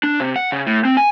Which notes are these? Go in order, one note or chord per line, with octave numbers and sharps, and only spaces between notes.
D4
C3
F#5
C#3
A2
C4
G#5